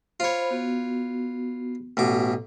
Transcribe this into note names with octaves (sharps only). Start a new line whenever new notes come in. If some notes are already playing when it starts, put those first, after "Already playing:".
F4 C5 C#5 B5
B3 F#4
A1 B2 A4 D6